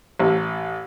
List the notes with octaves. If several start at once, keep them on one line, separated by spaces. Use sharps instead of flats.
A1